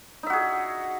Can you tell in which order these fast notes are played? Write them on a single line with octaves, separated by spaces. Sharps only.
D#4 E5 F#4 G#4